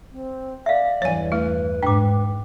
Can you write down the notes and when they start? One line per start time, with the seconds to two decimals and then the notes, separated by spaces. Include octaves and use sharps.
0.12 C4
0.66 D5 E5 F5
1.02 E2 G2 E3 C#5 G#5
1.32 A3 E4 B4
1.83 G#2 D4 G5 D6